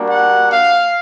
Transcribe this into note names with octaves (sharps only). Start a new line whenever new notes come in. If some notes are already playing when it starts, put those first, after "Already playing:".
Already playing: G3 A#3 D4 F#4
F#5
F5